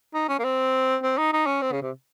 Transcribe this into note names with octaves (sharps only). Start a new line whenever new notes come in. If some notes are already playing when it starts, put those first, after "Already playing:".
D#4
C#4
A#3
C4
C4
D#4
D#4
C#4
C4
C#3
C3